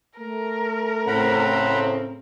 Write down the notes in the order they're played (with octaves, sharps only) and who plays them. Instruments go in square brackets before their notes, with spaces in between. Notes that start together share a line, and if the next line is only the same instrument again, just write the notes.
[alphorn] A3 [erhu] A#4
[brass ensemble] A2 C#3 C4 [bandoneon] F#5 A#5 B5